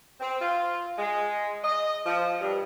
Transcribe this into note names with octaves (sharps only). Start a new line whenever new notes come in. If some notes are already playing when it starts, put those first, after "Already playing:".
C4
F4
G#3
D#5
F3
G2